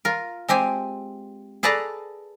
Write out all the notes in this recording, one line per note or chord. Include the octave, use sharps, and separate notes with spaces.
F4 A#4
G#3 C4 G4 G#5
G#4 A4 B4 D5 A5 A#5